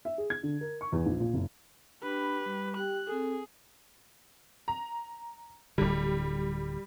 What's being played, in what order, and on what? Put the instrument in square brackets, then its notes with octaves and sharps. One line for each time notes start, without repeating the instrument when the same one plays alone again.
[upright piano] E5
G#4
G#6
D3
A#4
C#6
E2
A#1
A#2
F#1
[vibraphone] D4 B5 [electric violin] G4 B4
[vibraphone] G3
[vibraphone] G4 G5 [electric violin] F#6
[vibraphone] C4 A4 [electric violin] G#4
[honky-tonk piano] A#5
[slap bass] D1 D3 [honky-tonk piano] G3